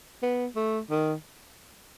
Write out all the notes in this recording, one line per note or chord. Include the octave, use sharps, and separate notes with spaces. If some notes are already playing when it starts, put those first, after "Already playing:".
B3
A3
D#3